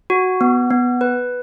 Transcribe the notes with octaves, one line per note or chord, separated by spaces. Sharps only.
F#4
B3
B3
B4